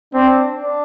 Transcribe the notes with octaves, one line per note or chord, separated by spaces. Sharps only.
C4 D4
D4